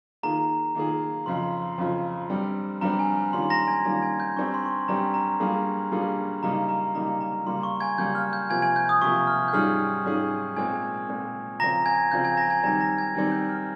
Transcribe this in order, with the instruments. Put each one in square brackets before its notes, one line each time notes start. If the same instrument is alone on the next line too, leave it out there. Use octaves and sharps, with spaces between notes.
[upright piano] D#3 A#3 F4 G#4 [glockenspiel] A#5
[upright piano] D#3 A#3 F4 G#4
[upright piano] F2 C#3 F3 [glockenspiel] C6
[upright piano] F2 C#3 F3
G2 G3 C4
[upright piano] G2 G3 C4 [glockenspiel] A#5
[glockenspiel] G#5
[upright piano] D#3 G3 A#3 C#4 F4 [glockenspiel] C6
[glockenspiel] A#5 A#6
G#5 G#6
[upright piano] D#3 G3 A#3 C#4 F4 [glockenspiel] A#5 A#6
[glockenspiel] G#5 G#6
G6
[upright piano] G2 G3 C4 G4 [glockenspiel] C#6
[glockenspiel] C6
C#6
C6
[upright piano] G2 G3 C4 G4 [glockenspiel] A#5
[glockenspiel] A#5
[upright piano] G2 G3 A#3 F4 G#4
G2 G3 A#3 F4 G#4
[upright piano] C#3 G3 A#3 D#4 [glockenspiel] A#5
[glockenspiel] A#5
[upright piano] C#3 G3 A#3 D#4 [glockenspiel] A#5
[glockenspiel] A#5
[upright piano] C#3 G3 A#3 [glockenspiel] C6
[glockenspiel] C#6
G#5 G#6
[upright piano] C#3 G3 A#3 [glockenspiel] G6
[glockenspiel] F6
G6
[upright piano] C3 F3 A#3 [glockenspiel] G#5 G#6
[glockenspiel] G#5 G#6
G6
D#6
[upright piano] C3 F3 A#3 [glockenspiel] C#6
[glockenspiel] F6
G6
[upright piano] G#2 G3 C#4 F4 G#4 [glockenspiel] F6
[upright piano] G#2 G3 C#4 F4 G#4
[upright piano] A#2 G#3 C4 [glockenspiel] G#5 G#6
[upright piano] A#2 G#3 C4
[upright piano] C#3 F3 C4 [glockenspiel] A#5 A#6
[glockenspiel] G#5 G#6
[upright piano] C#3 F3 C4 [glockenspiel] G6
[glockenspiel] G#5 G#6
A#5 A#6
G#5 G#6
[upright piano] D#3 G3 C4 [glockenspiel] A#5 A#6
[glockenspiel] A#5 A#6
G#5 G#6
[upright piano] D#3 G3 C4 [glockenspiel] G#5 G#6
[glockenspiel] G6
F6